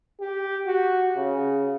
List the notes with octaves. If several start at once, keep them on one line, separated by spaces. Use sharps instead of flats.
G4
F#4
C#3